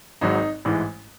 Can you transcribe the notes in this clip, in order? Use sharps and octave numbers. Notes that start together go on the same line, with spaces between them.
G#1 G#2 F#3 D#4
A1 G#2 E3 G#3